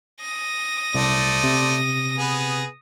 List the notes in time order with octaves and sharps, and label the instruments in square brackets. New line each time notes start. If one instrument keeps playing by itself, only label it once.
[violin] D#6 A#6
[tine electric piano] C2 [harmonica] A3 C5 D5
[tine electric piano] C3
[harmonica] B3 G#4 B4